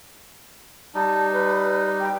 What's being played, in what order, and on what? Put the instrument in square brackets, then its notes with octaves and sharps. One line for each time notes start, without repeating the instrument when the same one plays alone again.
[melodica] G3 D#4 [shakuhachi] A5
[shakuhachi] B4
G5